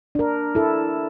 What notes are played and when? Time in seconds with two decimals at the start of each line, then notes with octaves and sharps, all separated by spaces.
0.15 D4 A#4
0.55 E4 A4